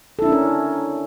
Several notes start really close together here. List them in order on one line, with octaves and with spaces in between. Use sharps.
A4 E4 D4 C#4 A#4